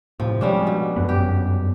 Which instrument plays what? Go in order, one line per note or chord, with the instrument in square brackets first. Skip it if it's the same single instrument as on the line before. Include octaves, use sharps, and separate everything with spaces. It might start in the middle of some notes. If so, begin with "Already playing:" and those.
[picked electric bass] A2 C3 [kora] F3
[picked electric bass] F3 G#3 [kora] G3 C#4 D4
[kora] B2
[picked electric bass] G1 F#2 B3
[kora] G4